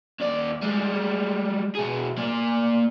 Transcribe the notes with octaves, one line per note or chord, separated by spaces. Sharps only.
D#2 D5
G3 G#3
B2 G#4
A#3 D5